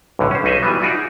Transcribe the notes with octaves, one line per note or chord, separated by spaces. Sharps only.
B1 A2 D3
C#4 C5
B1 C#4 D#4 G#4 D#5 E5
E3 F#3 G3 B3
D#4 F4 F#4 D5 E5 G#5
D#4 G#4